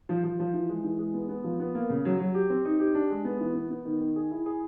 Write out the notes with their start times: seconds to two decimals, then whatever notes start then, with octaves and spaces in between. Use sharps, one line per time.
0.09 F3
0.24 F3
0.40 F3
0.54 E3
0.69 G#3
0.84 E3
0.99 G#3
1.14 B3
1.29 B3
1.44 F3
1.60 B3
1.75 A#3
1.89 C#3
2.05 F#3
2.19 F#3
2.34 G4
2.50 C4
2.65 D#4
2.80 G4
2.95 D4
3.10 G#3
3.25 B3
3.40 E3
3.55 B3
3.71 B3
3.85 D#3
4.01 D#3
4.16 G#4
4.31 E4
4.46 G#4